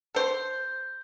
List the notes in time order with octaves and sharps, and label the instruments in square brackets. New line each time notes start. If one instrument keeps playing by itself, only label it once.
[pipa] A4 C5